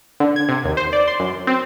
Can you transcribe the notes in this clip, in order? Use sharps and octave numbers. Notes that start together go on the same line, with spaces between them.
D3
G#6
C3
D#2
C5
D5
C6
F#2
C4